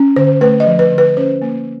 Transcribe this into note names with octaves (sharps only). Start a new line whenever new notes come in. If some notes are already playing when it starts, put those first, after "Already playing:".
Already playing: C#4
D3 C5
A3 B4
D#5
F3
B4
D3
B4
C#4 C5
A#3